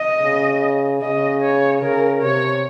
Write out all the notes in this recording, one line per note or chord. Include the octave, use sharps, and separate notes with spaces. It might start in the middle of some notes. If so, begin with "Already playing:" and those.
Already playing: D#5
C#3
C#3 D#5
C#5
C#3 A#4
C3 C#5